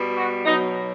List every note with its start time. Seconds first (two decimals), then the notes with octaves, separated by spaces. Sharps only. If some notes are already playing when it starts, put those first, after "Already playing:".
Already playing: B2 G3
0.16 F#4
0.45 B2 F#3 D#4